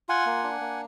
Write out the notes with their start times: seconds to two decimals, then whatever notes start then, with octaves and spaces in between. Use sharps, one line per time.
0.09 F4 F#5 G#5
0.26 A#3
0.44 D4
0.61 A#3